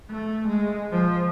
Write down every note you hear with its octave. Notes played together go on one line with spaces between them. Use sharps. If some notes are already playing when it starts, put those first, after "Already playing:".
A3
G#3
F3